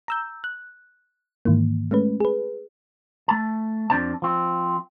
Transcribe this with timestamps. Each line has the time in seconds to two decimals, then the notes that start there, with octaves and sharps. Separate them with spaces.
0.08 A#5 E6 G6
0.44 F#6
1.45 G#2 D#3 E3 A#3
1.91 G#3 A3 C#4 B4
2.20 G#4 B4
3.28 A3 A5
3.90 F2 C4 D4 C5 A5
4.22 F3 C4